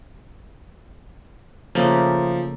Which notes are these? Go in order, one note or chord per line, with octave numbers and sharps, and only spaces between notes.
C#3 F3 A3 A#3